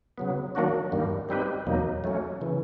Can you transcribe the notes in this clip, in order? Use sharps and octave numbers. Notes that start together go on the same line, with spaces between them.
C#3 F#3 B3
D#3 F#3 A#3 D4 F#4
G2 D#3 G3 A#3
G3 C4 D#4 G4 B4
E2 B2 F#3 A#3 D#4
F#3 A3 C#4
C#3 E3